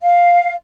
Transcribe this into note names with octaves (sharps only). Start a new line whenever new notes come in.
F5